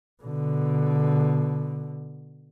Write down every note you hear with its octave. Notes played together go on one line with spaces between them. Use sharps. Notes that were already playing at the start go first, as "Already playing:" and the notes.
B2 D3